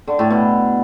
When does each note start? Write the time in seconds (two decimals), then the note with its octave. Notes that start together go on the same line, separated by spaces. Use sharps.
0.08 D3
0.19 A2
0.30 B2